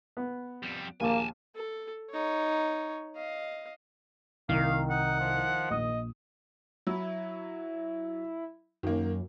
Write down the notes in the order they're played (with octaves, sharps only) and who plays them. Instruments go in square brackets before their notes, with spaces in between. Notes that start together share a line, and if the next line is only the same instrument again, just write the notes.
[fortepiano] B3
[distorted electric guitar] F2 G3
[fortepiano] A#1 D#2 D6 [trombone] A#3 [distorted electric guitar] G#5 A5
[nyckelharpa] A4
D#4 C#5
D#5 F5
[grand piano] C2 [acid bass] D#3 [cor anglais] A#3 [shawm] F5
[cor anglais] D#4 [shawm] F#5
[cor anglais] F3
[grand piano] A#1 D#6 [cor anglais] D#5
[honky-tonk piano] F#3 [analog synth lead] E4
[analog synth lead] F#2 [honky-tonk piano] D#3 A#3